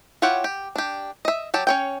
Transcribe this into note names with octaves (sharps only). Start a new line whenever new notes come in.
E4 F4 G4 C#5 F#5
G4
D4 G4
D#5 E5
F#3 G4 A5
C#4 C#5 G5